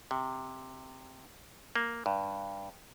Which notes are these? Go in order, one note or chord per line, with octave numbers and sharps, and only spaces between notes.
C3
A#3
G2